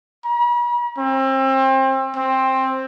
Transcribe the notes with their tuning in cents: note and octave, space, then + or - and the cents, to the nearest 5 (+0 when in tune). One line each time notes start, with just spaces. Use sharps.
B5 -45
C4 +30
C4 +10